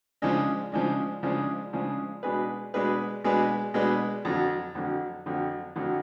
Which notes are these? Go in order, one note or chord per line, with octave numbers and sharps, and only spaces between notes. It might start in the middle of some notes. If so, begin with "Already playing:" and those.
C#3 F3 G#3 D4
C#3 F3 G#3 D4
C#3 F3 G#3 D4
C#3 F3 G#3 D4
B2 G#3 D4 G#4 B4
B2 G#3 D4 G#4 B4
B2 G#3 D4 G#4 B4
B2 G#3 D4 G#4 B4
F2 D3 F#3
F2 D3 F#3
F2 D3 F#3
F2 D3 F#3